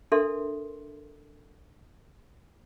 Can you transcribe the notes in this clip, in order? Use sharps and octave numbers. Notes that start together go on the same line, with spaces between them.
D4 A4 A#4 E5 C6